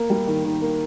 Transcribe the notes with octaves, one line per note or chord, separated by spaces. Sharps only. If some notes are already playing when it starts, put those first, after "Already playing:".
Already playing: A#3
G3
D#3
D#3
A#3